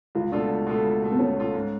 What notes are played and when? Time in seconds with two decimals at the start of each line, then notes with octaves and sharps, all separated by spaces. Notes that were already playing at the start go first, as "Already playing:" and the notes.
0.15 C#2 F4
0.32 B2 A3 D4 F4 A4
0.49 C#2
0.67 B2 A3 F4 A4
0.85 C#2
1.02 B2 A3 F4 A4
1.12 B3
1.19 C#2 C#4
1.37 B2 A3 F4 A4
1.54 G#2